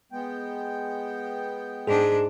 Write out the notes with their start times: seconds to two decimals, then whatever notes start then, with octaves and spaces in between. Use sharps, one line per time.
0.12 G#3 B3 G5
1.87 G#2 D4 G#4